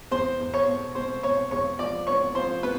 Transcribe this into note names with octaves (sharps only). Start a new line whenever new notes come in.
E2 C5 C6
E2
C#5 C#6
B2
B2 C5 C6
B2 C#5 C#6
E2 C#5 C#6
F3 D5 D6
B3 C#5 C#6
F3 C5 C6
B3 B4 B5